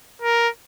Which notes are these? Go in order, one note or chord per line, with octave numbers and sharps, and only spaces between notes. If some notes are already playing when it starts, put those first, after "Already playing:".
A#4